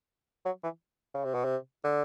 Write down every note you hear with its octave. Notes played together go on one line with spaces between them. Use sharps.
F#3
E3
C#3
C3
B2
C3
D3